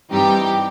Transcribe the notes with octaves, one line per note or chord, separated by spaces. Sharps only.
G2 E3 G3 C4 D#4 G4